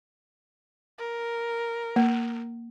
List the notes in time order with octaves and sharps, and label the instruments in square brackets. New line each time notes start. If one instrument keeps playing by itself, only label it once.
[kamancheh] A#4
[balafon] A#3